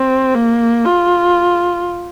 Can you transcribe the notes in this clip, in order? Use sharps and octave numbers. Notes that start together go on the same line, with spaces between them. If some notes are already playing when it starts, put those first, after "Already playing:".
Already playing: C4
A#3
F4